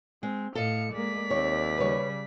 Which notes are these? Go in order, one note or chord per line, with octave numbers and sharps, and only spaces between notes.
G#3 C4
A2 A4 D#5 F5 C#7
G#3 A#3 D5 B6
D#2 C4 C#5
C#3 G3 B4 C#5